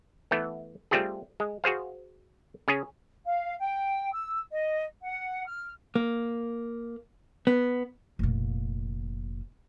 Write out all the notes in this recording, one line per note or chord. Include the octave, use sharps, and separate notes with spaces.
E3 A3 B3
G3 A3 C4 F4 G4 G#4
G#3
F#4 G#4 C5 F5
C#3 C#4 G#4
F5
G5
E6
D#5
F#5
F6
A#3
B3
F1 A#2